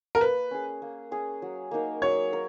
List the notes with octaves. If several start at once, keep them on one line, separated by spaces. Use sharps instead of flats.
A#4
A#3 B4
C#4 G#4
A#3
C#4 G#4
F#3
A#3 D#4 A#4
F#3 C#5
A#4